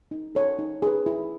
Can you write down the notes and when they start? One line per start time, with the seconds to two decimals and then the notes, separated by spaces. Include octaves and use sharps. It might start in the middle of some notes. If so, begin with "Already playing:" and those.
0.11 D#4
0.35 A4 C#5
0.59 D#4
0.82 G#4 B4
1.06 E4